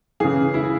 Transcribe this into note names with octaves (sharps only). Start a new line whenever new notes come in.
C#3 E3 G#4
E4